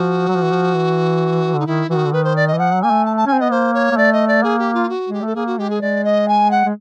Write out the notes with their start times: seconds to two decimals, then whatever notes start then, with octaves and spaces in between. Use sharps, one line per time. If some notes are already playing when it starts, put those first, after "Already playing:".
Already playing: F3 F#4
0.28 F#3
0.35 F3
0.43 E3
0.51 F3
0.74 E3
1.54 D3 D#4
1.66 D#3 E4
1.89 E3 F#4
1.98 D#3
2.05 D3
2.12 D#3 B4
2.24 C5
2.36 D5
2.47 D#5
2.54 E3
2.58 F3 F#5
2.73 F#3
2.82 A#3 G#5
2.90 A3
3.05 A5
3.16 A5
3.26 C#4 G#5
3.33 C4
3.40 B3 D#5
3.50 A#3 C5
3.73 C#5
3.92 A#3
3.97 A3 D5
4.12 D#5
4.27 D5
4.43 A#3 G#4
4.58 G4
4.74 F4
4.89 F#4
5.09 G#3 G4
5.22 A3 A4
5.35 A#3 G#4
5.46 F#4
5.58 G#3 G4
5.70 G#4
5.81 G#3 D5
6.04 D#5
6.28 G#5
6.50 F#5
6.65 G#3